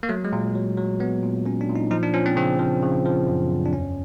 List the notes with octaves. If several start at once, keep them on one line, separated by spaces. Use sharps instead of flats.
A#3
F#3 A3
G#3
A#2
F#3
F#3
F#3 B3
A#2
F#3 C#4
D4
A#2
D#4
F3 D#4
D4
F3 C#4
C4
C#3 C4
F3
C#3
F3
F#2
F#2
D4
E2 C#4